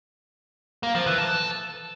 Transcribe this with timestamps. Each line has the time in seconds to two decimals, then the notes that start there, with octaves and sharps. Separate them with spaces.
0.83 A#3
0.95 F3
1.06 E3
1.18 A4